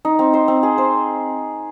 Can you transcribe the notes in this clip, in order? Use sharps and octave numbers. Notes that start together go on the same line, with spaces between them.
D#4
C4
C5
C4
G#4
C5